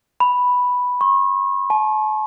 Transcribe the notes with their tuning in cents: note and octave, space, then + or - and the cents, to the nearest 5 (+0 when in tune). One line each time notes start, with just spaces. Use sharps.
B5 +0
C#6 -40
A5 -40